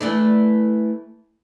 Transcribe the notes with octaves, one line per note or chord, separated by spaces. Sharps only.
E3 A3 D4